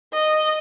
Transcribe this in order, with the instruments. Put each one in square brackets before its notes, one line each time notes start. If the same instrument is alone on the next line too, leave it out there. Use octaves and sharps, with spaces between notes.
[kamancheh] D#5